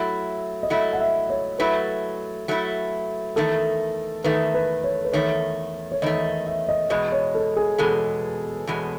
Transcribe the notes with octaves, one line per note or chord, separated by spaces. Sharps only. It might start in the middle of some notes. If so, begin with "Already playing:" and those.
Already playing: F#3 A3 E4 E5
D#5
F#3 A3 E4 E5
F#5
E5
C#5
F#3 A3 E4 B4
F#3 A3 E4
E2 D#3 A3 A4
E2 D#3 A3 B4
B4
C#5
B4
E2 D#3 A3 C#5
C#5
E2 D#3 A3 D#5
E5
D#5
E2 B2 G#3 D#5
C#5
A4
G#4
E2 B2 G#3 A4
E2 B2 G#3